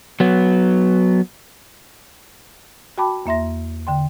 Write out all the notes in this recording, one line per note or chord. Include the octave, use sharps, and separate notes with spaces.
F#3 B3
F#4 G5 A5 B5 D6
E2 A#3 E5 C6 A#6
D3 G5 C6